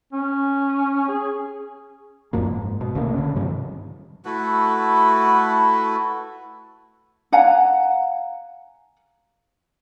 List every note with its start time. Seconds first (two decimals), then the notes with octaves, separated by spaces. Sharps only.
0.13 C#4
1.08 G#4
2.33 F1 F#2 F3 A#3
2.47 G#2
2.81 B2
2.95 B1 C#3 A3 A#3
3.13 D3 C#4
3.36 G2 C3 D#3 F3
4.25 A3 E4 F#4 B4
7.32 F5 F#5 G#5 A#5